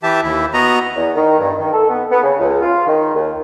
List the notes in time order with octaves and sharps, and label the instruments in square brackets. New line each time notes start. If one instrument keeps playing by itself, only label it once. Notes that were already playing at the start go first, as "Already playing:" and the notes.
[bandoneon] E3 G4 E5 A5
D#2 E4
B3 F#4 D#5 A#5
[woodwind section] E2
D#3
G2
D#3
A4
B3
B3
C#3
C#2
F4
D#3
D#2